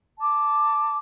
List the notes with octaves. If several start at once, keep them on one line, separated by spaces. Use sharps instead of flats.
A5 D6